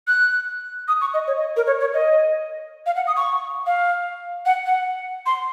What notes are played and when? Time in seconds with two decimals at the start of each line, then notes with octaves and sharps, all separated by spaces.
0.08 F#6
0.88 D#6
1.01 C#6
1.14 D#5
1.28 C#5
1.37 D#5
1.57 A#4
1.67 C#5
1.80 C#5
1.94 D#5
2.86 F5
2.96 F#5
3.07 D#6
3.16 C#6
3.66 F5
4.46 F#5
4.66 F#5
5.26 C6